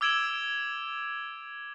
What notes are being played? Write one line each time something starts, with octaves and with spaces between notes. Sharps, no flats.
D6 E6 G#6 D7 E7 F#7